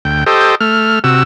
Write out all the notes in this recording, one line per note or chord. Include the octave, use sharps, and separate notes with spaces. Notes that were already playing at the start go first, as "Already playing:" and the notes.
D2 G5
G4 A4 C5 D#5
A3 F6
C3 F#4 E6